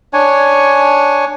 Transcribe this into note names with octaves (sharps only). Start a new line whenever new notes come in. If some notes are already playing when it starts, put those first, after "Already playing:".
D4 C#5 G#5